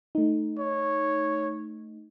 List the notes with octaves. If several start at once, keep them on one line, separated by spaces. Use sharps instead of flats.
A3 D#4
C#5